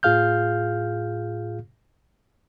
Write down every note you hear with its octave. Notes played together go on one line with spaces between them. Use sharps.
A2 F4 G#4 F5 F6 G6